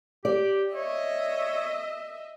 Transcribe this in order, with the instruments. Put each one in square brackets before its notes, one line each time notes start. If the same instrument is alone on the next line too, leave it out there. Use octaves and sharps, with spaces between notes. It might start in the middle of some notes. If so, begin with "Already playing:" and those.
[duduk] G4 [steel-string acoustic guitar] D5
[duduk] C#5 [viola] D#5 E5